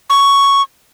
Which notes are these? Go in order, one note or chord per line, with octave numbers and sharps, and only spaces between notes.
C#6